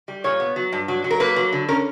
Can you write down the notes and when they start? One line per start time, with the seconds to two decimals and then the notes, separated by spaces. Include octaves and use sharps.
0.08 G3
0.24 A#2 C#5
0.40 B3
0.56 F#3
0.72 G2
0.88 F#3
1.04 F#3
1.11 A#4
1.20 A#3 B4
1.36 F#3
1.53 D3
1.68 C#4 A#4